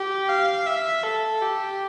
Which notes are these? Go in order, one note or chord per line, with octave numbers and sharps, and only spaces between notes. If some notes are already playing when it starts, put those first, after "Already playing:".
Already playing: G4
F5
E5
A4
G4